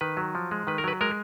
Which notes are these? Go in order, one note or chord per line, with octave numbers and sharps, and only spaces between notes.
D#3 B4
F#3
F3
G#3
D#3 B4
A#4
F#3 B4
G#3 A#4